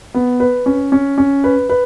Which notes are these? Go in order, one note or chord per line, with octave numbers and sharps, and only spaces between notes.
B3
B4
C#4
C#4
C#4
B4
B4